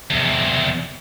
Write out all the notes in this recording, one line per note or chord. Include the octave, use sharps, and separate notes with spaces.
E2 C3